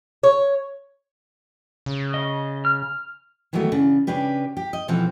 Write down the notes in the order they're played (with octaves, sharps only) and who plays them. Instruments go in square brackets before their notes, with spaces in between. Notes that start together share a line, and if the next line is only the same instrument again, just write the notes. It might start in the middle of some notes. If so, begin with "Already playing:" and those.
[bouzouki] C#5
[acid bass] C#3
[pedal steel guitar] D#5
F6
[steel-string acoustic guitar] D#3 E3 F#3 G#3 A3 B3
C#3 D4
C#3 C#4 D4 G4 B4
G4
D#5
B2 E3 F3 G3 C4 A4